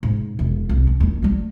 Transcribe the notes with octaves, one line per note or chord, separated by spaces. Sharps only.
G#2
E1 F4
C2
C#4
D#2 E4
G3 A3